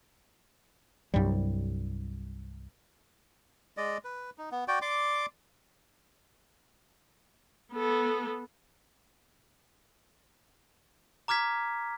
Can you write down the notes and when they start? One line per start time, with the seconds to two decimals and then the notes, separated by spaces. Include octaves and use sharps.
1.14 C2 G2 F#3 G3
3.77 G#3 D5 D#5
4.04 B4
4.38 D#4
4.52 B3
4.68 F#4 D5 G5
4.82 D5 C6 D6
7.73 B3 A4
11.28 A#5 D6 F6 G#6 B6